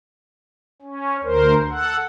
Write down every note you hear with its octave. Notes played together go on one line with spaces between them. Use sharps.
C#4
D2 A#4 C5
A4 F#5